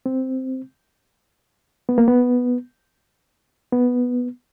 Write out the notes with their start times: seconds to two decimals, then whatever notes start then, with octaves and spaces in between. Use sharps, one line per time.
0.06 C4
1.89 B3
1.98 A#3
2.08 B3
3.72 B3